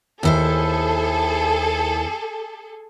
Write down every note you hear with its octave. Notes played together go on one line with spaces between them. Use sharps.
D#2 E4 G#4 A4 C5